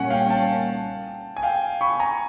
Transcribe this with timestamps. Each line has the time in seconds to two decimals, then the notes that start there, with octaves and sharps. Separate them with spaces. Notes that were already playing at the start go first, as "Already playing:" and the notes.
Already playing: A#2 G3 A#3 C#4 F#5 G#5
0.10 F5 G5
0.30 G5 A5
1.37 G#5
1.43 F5 G5
1.81 B5 C#6
2.00 G#5 A#5